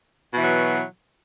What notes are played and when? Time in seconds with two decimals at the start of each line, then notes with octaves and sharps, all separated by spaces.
0.33 B2
0.38 E3
0.43 F#3